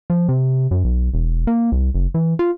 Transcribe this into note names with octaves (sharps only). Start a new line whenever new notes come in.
F3
C3
F#2
B1
E1
A#3
C2
F#1
E3
F4